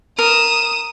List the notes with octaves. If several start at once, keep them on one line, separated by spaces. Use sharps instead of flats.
A#4 D#6 E7